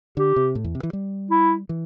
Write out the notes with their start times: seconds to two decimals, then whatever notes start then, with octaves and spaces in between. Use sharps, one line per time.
0.17 D3 G4
0.36 C3
0.55 A2
0.64 E2
0.75 C3
0.83 E3
0.93 G3
1.31 E4
1.69 E3